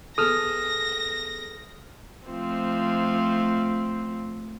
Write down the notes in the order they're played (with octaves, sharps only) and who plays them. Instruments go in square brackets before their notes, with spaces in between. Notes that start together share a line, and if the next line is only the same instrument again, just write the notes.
[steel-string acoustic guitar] B3 G#4 A4 [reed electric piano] D#6 F6 [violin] A#6
[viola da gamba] F3 A3 C4